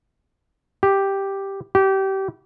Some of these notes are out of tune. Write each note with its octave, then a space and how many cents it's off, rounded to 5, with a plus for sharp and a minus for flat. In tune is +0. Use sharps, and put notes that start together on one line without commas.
G4 +0
G4 -25